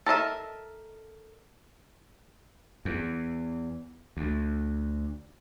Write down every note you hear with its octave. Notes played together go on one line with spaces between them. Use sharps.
A4 A#4 D#5 E5
E2
D2